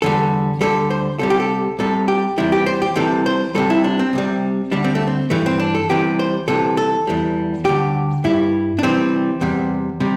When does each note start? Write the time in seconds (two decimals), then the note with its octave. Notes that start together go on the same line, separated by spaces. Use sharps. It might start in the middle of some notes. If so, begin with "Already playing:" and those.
0.02 E2 D3 G3 A4
0.61 D2 D3 G3 A4
0.90 C5
1.19 C2 C3 G3 A4
1.30 G4
1.40 A4
1.79 C2 C3 G3 A4
2.08 G4
2.38 E2 C3 E3 G3 E4
2.52 G4
2.66 C5
2.82 G4
2.96 C2 C3 E3 G3 A4
3.26 C5
3.55 C2 C3 E3 G3 A4
3.70 E4
3.84 D4
3.99 C4
4.13 C2 C3 G3
4.72 D2 D3 G3 D4
4.84 C4
4.95 A3
5.07 C4
5.30 G2 E3 G3 A3
5.46 C4
5.59 D4
5.75 A4
5.89 C2 C3 E3 G3 G4
6.19 C5
6.48 C2 C3 E3 A4
6.77 A4
7.07 E2 E3 G3
7.65 D2 D3 G3 G4
8.24 G2 G3 E4
8.79 D4
8.83 C2 C3 E3 G3 C4
9.41 E2 C3 G3
10.00 C3 G3